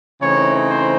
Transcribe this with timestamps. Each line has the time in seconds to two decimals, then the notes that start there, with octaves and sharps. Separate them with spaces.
0.21 C#3 E3 A3 C4 D#4 C#5
0.67 C5